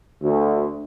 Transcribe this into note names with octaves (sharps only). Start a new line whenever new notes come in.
D2